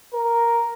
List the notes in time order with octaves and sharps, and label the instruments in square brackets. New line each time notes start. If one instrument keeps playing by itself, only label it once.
[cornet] A#4